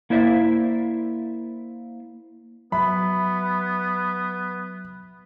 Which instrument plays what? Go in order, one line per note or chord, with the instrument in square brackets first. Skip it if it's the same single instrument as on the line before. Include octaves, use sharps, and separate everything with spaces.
[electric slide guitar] A#3 E4 C5 D5 E5
[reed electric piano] F#3 E5 [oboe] B3 [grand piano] B5